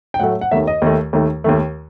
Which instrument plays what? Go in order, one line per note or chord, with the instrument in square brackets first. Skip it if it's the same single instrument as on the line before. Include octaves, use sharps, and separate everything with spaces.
[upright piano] G5
A2 F#3 A3 F#5
F#5
D#2 D#3 A3 E5
D#5
D#2 D#3 A3
D#2 D#3 A3
D#2 D#3 A3